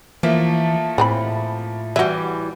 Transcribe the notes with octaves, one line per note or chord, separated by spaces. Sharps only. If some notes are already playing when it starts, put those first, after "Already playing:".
E3 F3 A3 A#3
A2 E3 C4 B5
E3 G3 F#4 E5